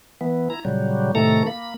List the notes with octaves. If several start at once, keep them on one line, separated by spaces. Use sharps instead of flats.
E3 B3
E4 A#5
A#2 C#3 F#3 G3
A2 C3 D#3 A3 A4 A#5
A#3 B5